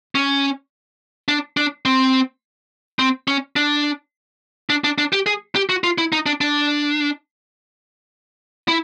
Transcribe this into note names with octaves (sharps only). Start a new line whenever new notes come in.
C#4
D4
D4
C4
C4
C#4
D4
D4
D4
D4
G4
G#4
G4
F#4
F4
E4
D#4
D4
D4
E4